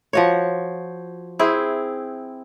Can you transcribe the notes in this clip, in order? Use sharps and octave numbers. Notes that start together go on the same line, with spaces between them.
F3 F#4 C#5
C4 E4 G#4